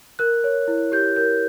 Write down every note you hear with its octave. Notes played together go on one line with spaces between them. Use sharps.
A#4 F#6
C#5
E4
G4 G6
A#4 G6